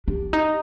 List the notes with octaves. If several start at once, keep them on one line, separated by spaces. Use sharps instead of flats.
D4 G4
D#4